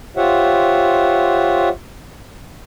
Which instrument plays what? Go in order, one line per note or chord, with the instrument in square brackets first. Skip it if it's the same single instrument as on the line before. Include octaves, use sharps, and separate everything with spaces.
[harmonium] F4 G4 C5 C#5 E5 F#5